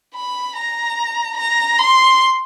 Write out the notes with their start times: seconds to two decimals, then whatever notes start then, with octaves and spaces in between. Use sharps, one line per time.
0.15 B5
0.56 A#5
1.37 A#5
1.79 C6